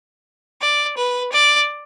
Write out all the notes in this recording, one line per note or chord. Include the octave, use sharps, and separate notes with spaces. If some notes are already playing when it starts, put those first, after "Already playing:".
D5
B4
D5